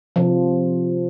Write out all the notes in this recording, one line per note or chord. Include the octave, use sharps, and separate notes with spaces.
C3 F3